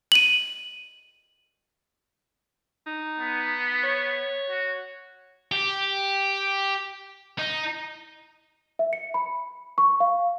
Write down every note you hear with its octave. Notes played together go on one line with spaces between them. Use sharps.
D#7 F#7
D#4
B3
C#5
F#4
G4
D#4
E5
C#7
B5
C#6
F5